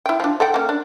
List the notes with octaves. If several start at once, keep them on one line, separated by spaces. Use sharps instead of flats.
E4 G5
F3 D4
A4 F#5 G5
A#3 C#4
D4